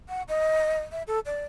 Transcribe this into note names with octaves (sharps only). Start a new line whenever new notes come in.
F#5
D#5
E5
A4
D5